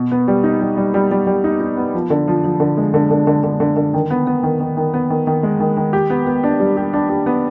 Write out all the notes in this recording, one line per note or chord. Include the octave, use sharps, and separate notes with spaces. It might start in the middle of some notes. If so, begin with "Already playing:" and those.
Already playing: B2
B3
G3
D#4
G3
G3
G3
G3
G3
D#4
D#4
B3
F3
D3
F3
F3
D3
G#3
D3
D3
D3
D3
D3
D3
D#3
B3
B3
D#3
D#3
D#3
B3
D#3
D#3
G#3
D#3
D#3
G4
B3
B3
D4
G3
G4
D4
G4
B3